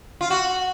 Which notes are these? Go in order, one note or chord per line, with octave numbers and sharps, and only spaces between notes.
F4
F#4